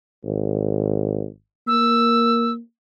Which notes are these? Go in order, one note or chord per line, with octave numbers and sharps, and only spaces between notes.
G#1
A#3 E6